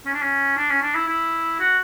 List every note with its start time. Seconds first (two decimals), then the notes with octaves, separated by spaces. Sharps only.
0.05 C#4
0.13 D4
0.21 C#4
0.57 D4
0.70 C#4
0.82 D4
0.95 E4
1.07 E4
1.59 F#4